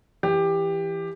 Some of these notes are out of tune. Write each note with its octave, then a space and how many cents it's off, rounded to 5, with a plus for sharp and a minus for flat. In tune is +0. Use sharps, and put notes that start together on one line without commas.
E3 +10 G4 +15